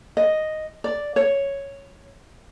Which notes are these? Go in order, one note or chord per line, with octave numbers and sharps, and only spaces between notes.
D#5
D5
C#5